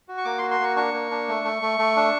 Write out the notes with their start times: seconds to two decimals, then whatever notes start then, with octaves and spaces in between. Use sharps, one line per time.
0.08 F#4
0.18 C#6
0.25 A#3 D6
0.38 C6
0.42 F#4
0.51 C6
0.60 A#3 C#6
0.76 D4 C#6
0.94 A#3
1.11 D4
1.28 A3
1.44 A3
1.62 A3
1.79 A3
1.96 D4